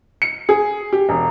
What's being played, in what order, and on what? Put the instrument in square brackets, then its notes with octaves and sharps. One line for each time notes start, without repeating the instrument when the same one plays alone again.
[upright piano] C#7
G#4
G4
E1